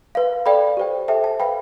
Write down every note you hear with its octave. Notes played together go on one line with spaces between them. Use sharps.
B4 F5
A4 D5 F5 G5 B5
G4 C5 G5
A4 C5 E5 G5 A5
A5
B4 F5 G5 B5